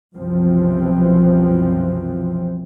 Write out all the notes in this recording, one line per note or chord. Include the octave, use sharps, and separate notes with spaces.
C2 F#2 B2 E3 F3 C4